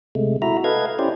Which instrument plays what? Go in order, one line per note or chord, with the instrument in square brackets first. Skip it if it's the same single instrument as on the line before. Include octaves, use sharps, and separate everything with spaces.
[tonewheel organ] C3 G#3 A3
E4 F#4 E5 A#5
A4 B4 D#5 F5 G#6
C#4 E4 G4 C5 D5